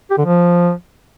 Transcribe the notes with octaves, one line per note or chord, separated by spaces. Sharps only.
G4
D3
F3